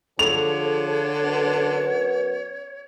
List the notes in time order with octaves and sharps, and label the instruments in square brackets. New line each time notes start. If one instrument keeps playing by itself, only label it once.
[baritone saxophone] D3 [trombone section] F3 G#4 A4 [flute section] C#5 G#6 [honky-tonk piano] F7
[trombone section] F#2 B3